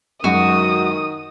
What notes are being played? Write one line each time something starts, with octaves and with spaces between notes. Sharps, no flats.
F#2 D#3 G#3 F#4 D#6